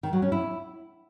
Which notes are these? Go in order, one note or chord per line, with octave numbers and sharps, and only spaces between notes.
D#3
F#3
C#4
E4